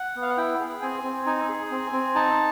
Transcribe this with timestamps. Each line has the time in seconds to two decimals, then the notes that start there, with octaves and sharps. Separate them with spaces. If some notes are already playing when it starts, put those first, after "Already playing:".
Already playing: F#5
0.16 B3
0.22 F5
0.30 F#5
0.38 E4 G5
0.60 G#4
0.82 C4 G#5
1.04 C4
1.26 D#4 G#5
1.49 G#4
1.71 C4
1.93 C4
2.15 D#4 A5